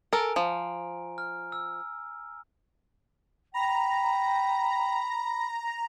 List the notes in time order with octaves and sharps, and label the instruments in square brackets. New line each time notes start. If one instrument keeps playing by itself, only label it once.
[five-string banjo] A4 A#4 [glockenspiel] G#5 A#5 D7
[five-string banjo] F3
[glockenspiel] F6
E6
[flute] G5 [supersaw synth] A#5 [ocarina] B5